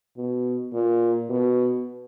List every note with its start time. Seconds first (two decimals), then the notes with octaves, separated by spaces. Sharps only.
0.17 B2
0.73 A#2
1.30 B2